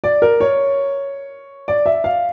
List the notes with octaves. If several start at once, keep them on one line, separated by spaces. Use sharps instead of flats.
D5
A#4
C#5
D5
E5
F5